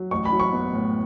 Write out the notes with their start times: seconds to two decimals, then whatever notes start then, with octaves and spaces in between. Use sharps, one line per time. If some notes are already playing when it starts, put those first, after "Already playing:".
Already playing: F#3
0.11 A1 C#6
0.25 B5
0.32 F#3
0.40 C#6
0.53 B3
0.73 A2